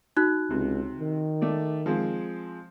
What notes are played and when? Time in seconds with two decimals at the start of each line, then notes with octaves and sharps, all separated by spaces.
0.17 D#4 F#4 F#6
0.50 C#2 C3
1.00 D#3
1.41 A3 D5
1.86 F3 G#3 C4